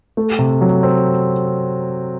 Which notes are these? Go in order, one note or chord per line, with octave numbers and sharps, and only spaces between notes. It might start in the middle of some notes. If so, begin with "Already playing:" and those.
A3
C3
F#3
C4